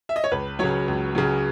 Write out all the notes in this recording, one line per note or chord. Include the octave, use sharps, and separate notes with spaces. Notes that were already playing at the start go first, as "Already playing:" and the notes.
E5
D#5
C#5
C#2 B4
C#3 F#3 C#5
C#2
C#3 F#3